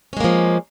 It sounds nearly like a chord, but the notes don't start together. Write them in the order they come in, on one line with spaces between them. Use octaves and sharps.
C#4 G#3 A#3 F3